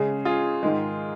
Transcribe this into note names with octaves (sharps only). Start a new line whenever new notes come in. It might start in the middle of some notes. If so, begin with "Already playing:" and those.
Already playing: C#3 G#3 C#4 G#4
F4 G#4
G#2 D#3 G#3